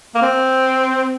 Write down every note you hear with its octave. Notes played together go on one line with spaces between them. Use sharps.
A#3
C4